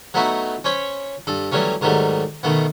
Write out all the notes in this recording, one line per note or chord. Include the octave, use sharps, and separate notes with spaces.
F#3 A3 B3 D#4 E4 F#4
C#4 C5 C#5 B5
G2 A4
E3 F#3 G3 A3 C#4
G#2 D#3 F#3 G3 A3
B2 D#3 A3 B3